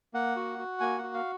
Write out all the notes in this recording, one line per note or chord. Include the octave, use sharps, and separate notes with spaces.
A#3 F#5
F#4
F#4
A#3 G#5
F#5
F#4
F5